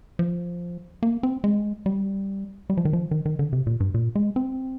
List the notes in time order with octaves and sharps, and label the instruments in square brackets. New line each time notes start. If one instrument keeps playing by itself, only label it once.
[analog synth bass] F3
A#3
C4
G#3
G3
G3
F3
D#3
F3
D#3
D#3
D3
C3
A#2
G2
A#2
G#3
C4